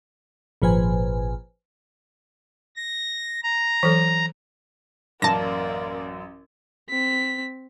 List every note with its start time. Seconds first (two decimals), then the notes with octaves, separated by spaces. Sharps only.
0.62 G#1 A#2 F3 B4 C5 G#5
2.76 A#6
3.43 A#5
3.83 E3 F#3 A4
5.22 A1 F#2 A#3 D5 A5 A#6
6.89 C4 B6